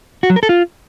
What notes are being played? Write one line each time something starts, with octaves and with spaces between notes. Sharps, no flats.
F#4
F#3
A#4
A4
F4